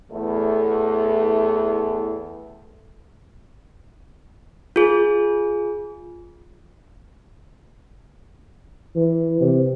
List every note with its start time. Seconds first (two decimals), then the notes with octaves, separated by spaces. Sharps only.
0.12 E2 A2 A3
4.76 F4 G#4
8.96 E3
9.41 C3